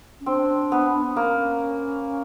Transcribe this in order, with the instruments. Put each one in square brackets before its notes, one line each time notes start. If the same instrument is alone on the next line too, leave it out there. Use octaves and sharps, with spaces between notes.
[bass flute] C#4
[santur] C4 [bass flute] D4
[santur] B3
[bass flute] D4
[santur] A#3 [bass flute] C#4